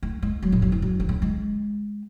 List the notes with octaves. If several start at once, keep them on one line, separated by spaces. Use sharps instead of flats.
A3
G#3
F#3
A2
F#2
E2
F#2
D#3
C#3
G#3